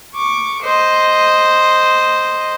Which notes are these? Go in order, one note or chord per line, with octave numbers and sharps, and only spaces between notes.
C#6 D6
C5 D#5